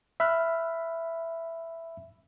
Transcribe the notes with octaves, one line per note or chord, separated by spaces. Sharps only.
E5 B5 F6 F#6